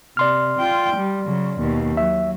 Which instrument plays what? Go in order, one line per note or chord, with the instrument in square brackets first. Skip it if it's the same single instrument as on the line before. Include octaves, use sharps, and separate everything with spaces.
[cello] C3 [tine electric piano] D5 C6 F6
[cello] F4 G5
G3
C#3 F#3
D#2 B2
[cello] F#3 [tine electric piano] E5